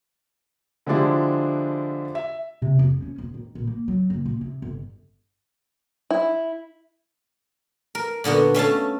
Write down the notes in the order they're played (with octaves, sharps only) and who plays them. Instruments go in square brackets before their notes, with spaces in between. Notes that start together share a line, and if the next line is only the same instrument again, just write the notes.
[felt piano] D3 F3 G#3 D4 E4 G4
E5
[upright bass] C3
F2
C#4
E1
D#3
A#1
A#3
F#3
F#1
A#2
C3
G1
[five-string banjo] E4
[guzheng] A#4
A#2 D3 B3 F#4
A3 C#4 F5 A5